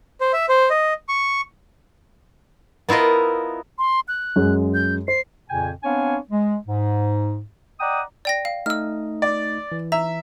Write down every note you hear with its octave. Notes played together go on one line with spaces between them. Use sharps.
C5
E5
C5
D#5
C#6
B3 E4 F4 A#4 D#5
C6
F#6
F#2 G#3
G6
C5 C7
F2 A#2 C#3 G5 G#5
B3 C4 D4 C#5 F5 G#5
G#3
G#2
D5 D#5 F#5 G5 A#5 D#6
D5 G5 A#6
F5
A3 D#4 D#5 E6 F6
D5
E3
E5 A#5